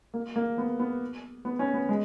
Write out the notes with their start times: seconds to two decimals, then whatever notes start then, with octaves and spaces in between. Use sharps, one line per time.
0.14 A#3
0.36 A#3
0.58 B3
0.80 B3
1.45 B3
1.59 C#4
1.74 B3
1.89 G#3